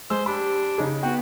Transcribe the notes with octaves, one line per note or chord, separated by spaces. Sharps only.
G#3 C5 E6
D4 G4 B5
C#3 D#4 G#4
B3 F#4 G5